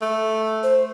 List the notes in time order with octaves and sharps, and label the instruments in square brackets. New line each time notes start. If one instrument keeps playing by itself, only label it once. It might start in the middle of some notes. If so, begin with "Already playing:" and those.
[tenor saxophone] A3
[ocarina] C5